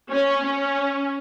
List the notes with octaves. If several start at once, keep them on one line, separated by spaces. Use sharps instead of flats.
C#4
C#4